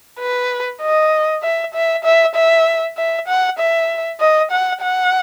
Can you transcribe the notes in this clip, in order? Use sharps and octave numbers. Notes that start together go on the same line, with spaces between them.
B4
D#5
E5
E5
E5
E5
E5
F#5
E5
D#5
F#5
F#5